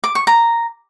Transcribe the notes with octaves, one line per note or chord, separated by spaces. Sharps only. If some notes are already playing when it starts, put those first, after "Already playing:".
D6
C#6
A#5